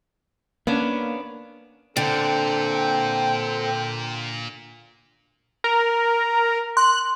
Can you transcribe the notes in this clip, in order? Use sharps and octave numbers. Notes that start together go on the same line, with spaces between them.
A#3 B3 C#4 D4
A#2 D3 C4 A4 G5
A#4
C6 F#6